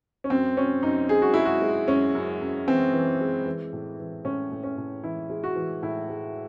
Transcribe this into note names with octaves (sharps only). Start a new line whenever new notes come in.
C#4
F#2 C4
F#2 C#4
F#2 D#4
G#3 G#4
F#4
G#3 E4
F#4
G#3
F#2 C#4
F#2
F#2
E3 C4
E3
G#3
E3
A2
E3
A2 C#4
A2
C#4
A2
E3 E4
G#3
F#4
E3
A2 E4
G#3